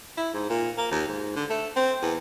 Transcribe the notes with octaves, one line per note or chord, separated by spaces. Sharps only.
E4
G#2
A#2
A#3
D#2
G#2
D3
A3
C4
E2